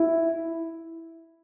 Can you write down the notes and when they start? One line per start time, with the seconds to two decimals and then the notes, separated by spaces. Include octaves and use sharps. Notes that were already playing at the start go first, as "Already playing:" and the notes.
Already playing: E4